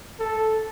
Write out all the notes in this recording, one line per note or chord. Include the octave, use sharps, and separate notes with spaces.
A4